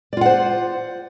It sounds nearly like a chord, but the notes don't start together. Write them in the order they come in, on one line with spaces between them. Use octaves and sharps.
D5 F4 F#5 C5